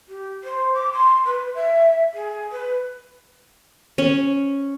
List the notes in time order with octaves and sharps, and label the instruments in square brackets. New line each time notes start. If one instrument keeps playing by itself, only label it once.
[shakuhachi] G4
C5
D6
C6
B4
E5
G#4
B4
[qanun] C#4